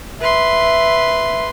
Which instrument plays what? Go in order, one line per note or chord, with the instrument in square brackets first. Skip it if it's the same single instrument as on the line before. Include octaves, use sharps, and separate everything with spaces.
[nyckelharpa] B4 C6 [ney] E5